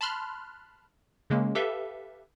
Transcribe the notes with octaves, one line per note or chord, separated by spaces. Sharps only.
A5 B5 C6 F6 F#6
C#3 G#3 A#3 C#4
G4 A4 B4 E5 F5